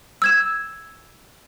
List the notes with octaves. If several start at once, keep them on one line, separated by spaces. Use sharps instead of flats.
E6 G#6 E7